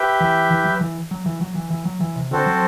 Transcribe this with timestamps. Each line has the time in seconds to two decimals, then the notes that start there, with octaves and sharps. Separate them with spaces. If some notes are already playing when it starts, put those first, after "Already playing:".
Already playing: G4 B4 E5 G5
0.20 E3
0.50 E3
0.65 F#3
0.81 E3
1.11 F#3
1.26 E3
1.41 F#3
1.55 E3
1.70 E3
1.85 F#3
2.00 E3
2.16 C3
2.31 D3 C4 F#4 A4 C5
2.46 F#3